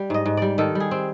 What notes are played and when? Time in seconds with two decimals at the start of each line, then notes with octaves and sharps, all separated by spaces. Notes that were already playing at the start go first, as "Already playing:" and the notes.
Already playing: G3
0.10 G#2 D#5
0.26 G#2
0.37 G3 D5
0.58 D#3 A4
0.75 G3
0.80 G#4
0.91 C4